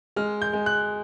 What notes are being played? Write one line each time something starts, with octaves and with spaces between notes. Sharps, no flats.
G#3 F6
G6
G#3
F#6